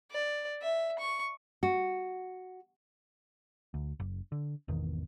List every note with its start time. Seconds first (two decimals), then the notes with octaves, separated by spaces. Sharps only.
0.11 D5
0.62 E5
0.99 C#6
1.63 F#4
3.74 D2
4.00 F#1
4.32 D3
4.68 G#1 E2 B2 D#3